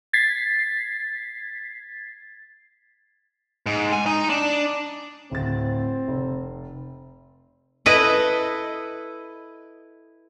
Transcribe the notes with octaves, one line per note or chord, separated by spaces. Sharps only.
G#6 A6 B6 C7
G#2
G#5
D#4
D4
D1 C4 A6
F1
E4 A4 B4 D#5